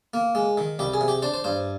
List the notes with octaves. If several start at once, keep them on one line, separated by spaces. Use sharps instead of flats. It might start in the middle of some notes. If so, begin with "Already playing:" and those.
A#3
G#3
D#3
C2 G4
G#4
C3
G4
D4 C5
C5
G2 C5